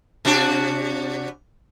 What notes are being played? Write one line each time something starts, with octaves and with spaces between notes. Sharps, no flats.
C3 D4 F#4